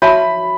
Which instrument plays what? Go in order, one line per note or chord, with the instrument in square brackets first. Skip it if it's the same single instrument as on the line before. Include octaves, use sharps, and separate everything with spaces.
[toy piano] F#4 C#5 E5 A5 C#6 [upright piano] B5